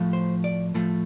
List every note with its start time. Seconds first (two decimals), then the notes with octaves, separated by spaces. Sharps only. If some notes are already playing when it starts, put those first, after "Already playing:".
Already playing: A2 F3 A3
0.13 C5
0.44 D5
0.74 A2 F3 A3